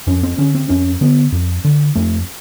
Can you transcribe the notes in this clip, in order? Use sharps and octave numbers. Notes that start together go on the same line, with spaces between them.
F2 C#4
C4
D3 C#4
C4
F2 C#4
D3 B3
F2
D3
F2 A3